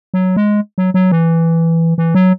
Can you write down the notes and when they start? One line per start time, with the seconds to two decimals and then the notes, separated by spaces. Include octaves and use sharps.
0.14 F#3
0.36 G#3
0.78 F#3
0.94 F#3
1.11 E3
1.98 E3
2.15 F#3